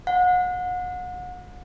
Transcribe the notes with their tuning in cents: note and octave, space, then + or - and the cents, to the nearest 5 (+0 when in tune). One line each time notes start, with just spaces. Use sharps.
F#5 -35